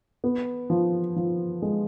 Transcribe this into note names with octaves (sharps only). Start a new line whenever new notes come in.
B3
F3
F3
G#3